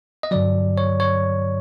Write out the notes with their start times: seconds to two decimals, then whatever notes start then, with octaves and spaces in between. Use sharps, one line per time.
0.23 D#5
0.31 G2 D3 F#3 D5
0.78 C#5
1.00 C#5